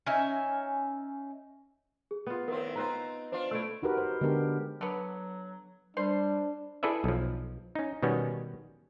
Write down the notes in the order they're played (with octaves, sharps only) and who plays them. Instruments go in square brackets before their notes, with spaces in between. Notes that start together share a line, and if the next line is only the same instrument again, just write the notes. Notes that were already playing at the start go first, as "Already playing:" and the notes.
[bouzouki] C#4 D#4 E5 G#5
[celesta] G#4
[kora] B3 F4
[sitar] A2 D#3 C4 [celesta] A#4
[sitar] C4 D#4 [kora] F4 B4 E5 [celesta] A#5
[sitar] D4 F4 [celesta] C5
[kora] A3 E4 [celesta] E6 D7
[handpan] D#4 F#4 G4 A#4 B4
C5
D3 G#3 B3 D4 G4 A#4
[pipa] D3 B3 [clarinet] F#3
[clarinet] G3 [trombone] D4 [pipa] C5
[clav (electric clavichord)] E4 G#4 A4 B4 D5 E5
B1 F3
C#4 D#4
B2 D#3 G3 B3 C#4